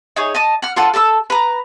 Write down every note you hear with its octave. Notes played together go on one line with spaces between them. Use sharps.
D#4 G#4 C#5
D#5 A5 D#6
F#5 F6
F4 A4 F#5
A4 A5 A#5 E6
B4 A#5